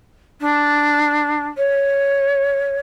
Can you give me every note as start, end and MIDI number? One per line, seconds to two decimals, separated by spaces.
0.41 1.47 62
1.57 2.79 73